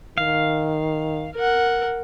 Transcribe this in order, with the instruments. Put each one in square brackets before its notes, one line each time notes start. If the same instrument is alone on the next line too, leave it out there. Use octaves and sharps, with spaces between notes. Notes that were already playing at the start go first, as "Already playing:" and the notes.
[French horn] D#3 [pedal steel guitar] F5
[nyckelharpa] A#4 F#5